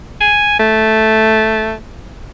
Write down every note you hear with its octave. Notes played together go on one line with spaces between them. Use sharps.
G#5
A3